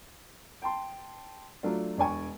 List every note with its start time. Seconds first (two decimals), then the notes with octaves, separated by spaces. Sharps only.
0.62 G5 A5 C6
1.63 F#3 A3 D4 F4
1.97 E1 D4 D5 G#5 C#6